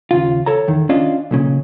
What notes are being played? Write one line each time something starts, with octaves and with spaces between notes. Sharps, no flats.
D#2 C#3 F4
A4 C#5 A#5
E2 D#3
C#4 D4 F4 D5 D#5
B1 A#2 C#3